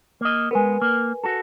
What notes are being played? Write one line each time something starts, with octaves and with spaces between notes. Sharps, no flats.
A#3 D#5
G#3 B3 A#4 B4 G#5
A#3
F#4 A4